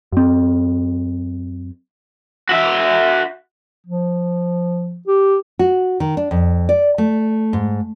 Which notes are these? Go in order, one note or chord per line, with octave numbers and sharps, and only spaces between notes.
F#2 C4
F#4 E5
F3
G4
F#4
D#3
D4
F2
D5
A3
G#2